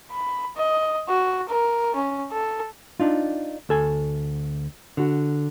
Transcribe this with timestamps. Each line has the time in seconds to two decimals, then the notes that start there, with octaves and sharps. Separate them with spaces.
0.11 B5
0.56 D#5
1.08 F#4
1.48 A#4
1.95 C#4
2.32 A4
3.00 D4 D#4 F4
3.69 D2 A4 G#5
4.97 D3 F#4